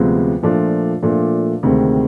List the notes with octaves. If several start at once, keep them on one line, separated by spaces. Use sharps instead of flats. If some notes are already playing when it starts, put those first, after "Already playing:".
Already playing: D2 C3 F3 G#3 B3
A#2 F3 A3 D4
A#2 F3 A3 D4
D2 C3 D#3 G#3 C4